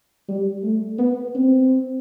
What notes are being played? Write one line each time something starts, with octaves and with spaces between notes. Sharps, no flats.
G3
A3
B3
C4